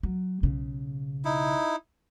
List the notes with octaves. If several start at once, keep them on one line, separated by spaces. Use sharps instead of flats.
F#3
B1 C#3
D#4 E4